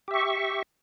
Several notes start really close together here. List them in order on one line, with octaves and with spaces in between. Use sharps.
G4 E5 C#6